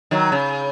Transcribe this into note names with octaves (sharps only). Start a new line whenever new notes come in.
D#3 F#3
C#3